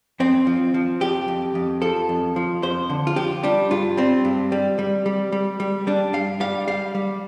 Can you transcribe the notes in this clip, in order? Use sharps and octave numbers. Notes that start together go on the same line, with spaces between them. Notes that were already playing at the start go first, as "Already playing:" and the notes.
F2 C4
F3
F3
F2 G4
F2
F2
F3 A4
F2
F3
F2 C5
D3
F4
F3 G4
G3 D4
G2 F4
G3 C4
G2
G3
G3
G3
G3
G3
G3 D4
G2 F5
G3 F5
G3 F5
G3